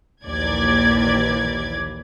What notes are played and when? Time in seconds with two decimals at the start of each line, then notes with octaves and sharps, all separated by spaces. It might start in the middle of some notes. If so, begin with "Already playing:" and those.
0.23 A#1 D#2 E3 D5 G#6